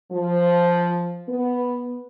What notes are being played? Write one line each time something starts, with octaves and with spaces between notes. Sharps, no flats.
F3
B3